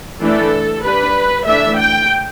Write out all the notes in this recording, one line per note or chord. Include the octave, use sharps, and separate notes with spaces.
E3 A3 D4 A4
G3 D4 B4
E3 A3 D4 E5
G5